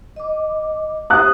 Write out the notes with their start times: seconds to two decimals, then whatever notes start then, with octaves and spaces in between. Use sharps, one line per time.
0.16 D#5 D6
1.10 G4 C5 D#6 F#6